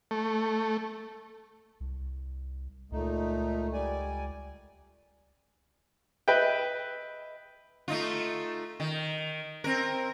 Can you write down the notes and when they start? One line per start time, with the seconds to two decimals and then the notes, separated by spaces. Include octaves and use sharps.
0.11 A3
1.80 C2
2.92 C#2 A#2 A3 D#4
3.73 G3 D5 G#5
6.28 B4 D#5 E5 G5
7.88 A3 D#4 F4
8.80 D#3
9.64 C4 A#4